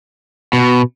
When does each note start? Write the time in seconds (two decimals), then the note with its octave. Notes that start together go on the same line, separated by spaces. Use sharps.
0.53 B2